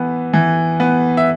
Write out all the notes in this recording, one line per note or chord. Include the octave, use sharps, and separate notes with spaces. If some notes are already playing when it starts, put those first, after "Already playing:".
Already playing: E3 B3
E3
B3
E5